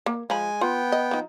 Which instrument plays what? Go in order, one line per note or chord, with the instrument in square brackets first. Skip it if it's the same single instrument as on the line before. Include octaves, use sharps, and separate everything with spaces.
[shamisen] A#3
[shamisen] F3 B5 [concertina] G#3 G#5
[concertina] B3 G5 [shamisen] F4
[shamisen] D#5
F3 D#4